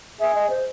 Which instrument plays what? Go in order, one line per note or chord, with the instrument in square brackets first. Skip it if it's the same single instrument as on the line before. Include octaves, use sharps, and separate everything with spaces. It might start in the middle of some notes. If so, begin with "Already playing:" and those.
[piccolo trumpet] G#4 [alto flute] E5
[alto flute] D#5
C5